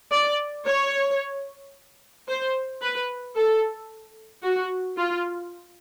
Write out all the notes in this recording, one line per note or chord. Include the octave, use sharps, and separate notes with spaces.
D5
C#5
C5
B4
A4
F#4
F4